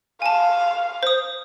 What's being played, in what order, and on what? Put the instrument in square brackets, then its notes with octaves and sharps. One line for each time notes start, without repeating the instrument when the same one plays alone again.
[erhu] F5 [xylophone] G#5 A5
[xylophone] C5 D#6